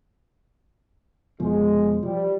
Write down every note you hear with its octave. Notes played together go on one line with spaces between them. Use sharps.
F1 B2 F3 G#3
F3 G3